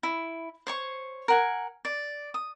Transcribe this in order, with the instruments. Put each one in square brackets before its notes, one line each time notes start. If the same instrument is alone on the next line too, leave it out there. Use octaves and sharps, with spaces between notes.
[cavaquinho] E4
C5 C#5 C#6
A#4 F#5 G#5
D5
D#6